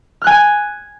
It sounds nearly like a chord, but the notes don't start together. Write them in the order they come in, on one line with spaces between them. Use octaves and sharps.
F6 F#6 G#5